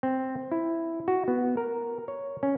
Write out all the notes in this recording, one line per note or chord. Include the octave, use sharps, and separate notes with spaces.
C4
E4
F#4
B3
A#4
C#5
C#4